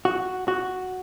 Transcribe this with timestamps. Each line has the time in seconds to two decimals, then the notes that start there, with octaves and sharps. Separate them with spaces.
0.05 F#4
0.48 F#4